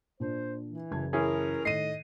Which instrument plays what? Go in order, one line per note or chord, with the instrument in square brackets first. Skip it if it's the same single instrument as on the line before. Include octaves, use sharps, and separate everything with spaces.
[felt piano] A#2 D4 [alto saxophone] C5
[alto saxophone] E3
[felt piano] F#1 A5 G#6
[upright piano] E3 C#4 G#4 [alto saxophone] A#4
[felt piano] A2 D#3 [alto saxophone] D#5 [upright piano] C7 D#7